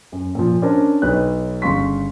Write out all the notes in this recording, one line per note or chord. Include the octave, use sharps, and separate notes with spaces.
F#2
A#2 F3
C#4 D4 A#4 C5 D5
B1 D#4 B4 C#5 F#6
G1 C#3 F5 C6 C#6 B6